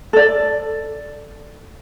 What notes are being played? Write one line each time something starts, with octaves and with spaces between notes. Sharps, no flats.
A4 D5